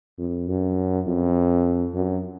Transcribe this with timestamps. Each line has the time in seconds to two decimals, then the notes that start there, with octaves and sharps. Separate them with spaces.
0.19 F2
0.48 F#2
1.07 F2
1.94 F#2